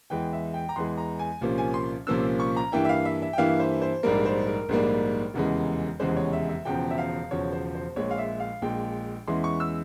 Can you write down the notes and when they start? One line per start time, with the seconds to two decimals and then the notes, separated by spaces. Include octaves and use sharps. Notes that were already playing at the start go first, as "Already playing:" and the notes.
0.10 E2 E3 G#3 G5
0.33 E5
0.54 G5
0.69 A#5
0.76 E2 E3 G#3 C6
0.98 A#5
1.19 G#5
1.41 C2 A#2 F3 A#3 C#4
1.58 G#5
1.74 C6
2.07 C2 A#2 F3 A#3 C#4 E6
2.40 C#6
2.56 A#5
2.72 G2 E3 A#3 E4 G5
2.85 E5
2.89 F5
3.05 E5
3.22 E5
3.33 G5
3.38 G2 E3 A#3 E4 F5
3.60 C5
3.82 C5
4.03 A#1 G#2 G3 A#3 A#4
4.25 C5
4.47 A#4
4.69 A#1 G#2 G3 A#3
5.34 F1 E2 C#3 E3 G#3
6.00 F1 E2 C#3 E3 G#3 C5
6.17 C#5
6.33 E5
6.49 E5
6.65 E1 E2 C#3 F3 G5
6.90 E5
6.98 F5
7.31 E1 E2 C#3 F3 C#5
7.53 C5
7.75 C5
7.96 A#1 A#2 G#3 C#5
8.11 F5
8.18 E5
8.40 F5
8.62 A#1 A#2 G#3 G5
9.27 E2 E3 G#3 C#4 E4 C6
9.44 C#6
9.60 E6